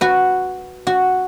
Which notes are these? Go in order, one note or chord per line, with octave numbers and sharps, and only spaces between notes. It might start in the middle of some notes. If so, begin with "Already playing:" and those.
F#4 B4
F#4